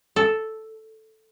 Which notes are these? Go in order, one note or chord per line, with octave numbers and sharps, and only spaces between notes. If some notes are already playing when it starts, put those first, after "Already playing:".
A4